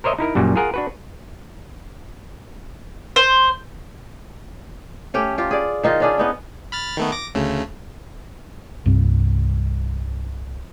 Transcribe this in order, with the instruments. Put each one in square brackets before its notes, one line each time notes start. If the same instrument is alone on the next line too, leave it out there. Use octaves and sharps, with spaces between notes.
[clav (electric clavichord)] A#4 C5 C#5 D#5 E5
D#4 E4 A#4
F#2 A#2 G3 F#4
F4 G#4 A#4 F#5
D4 F#4 B4
[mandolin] C5
[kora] A3 C#4 G4
F4 G4
G#4 D5
D#3 D#4 F4
C#4 D4 G#4
B3 D#4 E4
[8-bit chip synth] B5 F6 A6
D#3 A3 B3
D6 A#6
D2 C#3 A3
[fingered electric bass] C2 G2